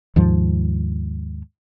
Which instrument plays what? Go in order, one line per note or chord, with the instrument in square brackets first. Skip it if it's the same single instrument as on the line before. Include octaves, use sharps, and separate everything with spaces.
[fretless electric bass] D#2 G#2 F3